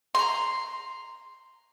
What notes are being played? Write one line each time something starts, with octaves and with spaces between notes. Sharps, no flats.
A#5 C6